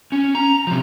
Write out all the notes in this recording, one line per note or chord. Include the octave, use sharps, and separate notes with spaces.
C#4
A#5
C3 F3